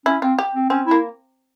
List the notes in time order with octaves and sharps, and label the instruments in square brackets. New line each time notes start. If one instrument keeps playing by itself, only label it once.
[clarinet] C#4 [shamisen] E4
[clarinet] C4 [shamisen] F4
[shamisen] G4
[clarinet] C4
[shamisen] C4 [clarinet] C#4
[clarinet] E4
[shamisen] A#3